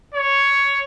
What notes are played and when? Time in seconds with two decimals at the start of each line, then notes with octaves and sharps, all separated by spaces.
0.14 C#5